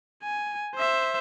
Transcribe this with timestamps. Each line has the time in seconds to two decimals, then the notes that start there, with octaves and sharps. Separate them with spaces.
0.24 G#5
0.75 C5 E5